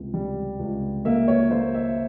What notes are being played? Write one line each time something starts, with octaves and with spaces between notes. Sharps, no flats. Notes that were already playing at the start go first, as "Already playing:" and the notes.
Already playing: C#2 C3
G3
C#2
A#3 E5
C#5
A#3 C5
E5